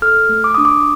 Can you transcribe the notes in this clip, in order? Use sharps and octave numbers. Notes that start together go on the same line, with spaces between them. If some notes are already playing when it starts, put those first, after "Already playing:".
A4 F6
A3
D6
D4 D#6
D6